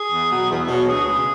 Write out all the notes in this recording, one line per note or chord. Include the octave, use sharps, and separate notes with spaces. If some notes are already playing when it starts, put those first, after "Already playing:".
Already playing: G#4
E2
B2 F#3
E2
B2 F#3
D2 G#4
C#3 G#3